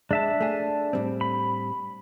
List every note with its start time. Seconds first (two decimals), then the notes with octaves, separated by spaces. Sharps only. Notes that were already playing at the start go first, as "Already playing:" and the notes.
0.11 G#3 D4 E5 A5
0.40 A3 G#4
0.93 A2 G3 C4
1.21 B5